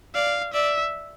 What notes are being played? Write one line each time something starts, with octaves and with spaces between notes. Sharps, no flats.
D5 F5
D5 E5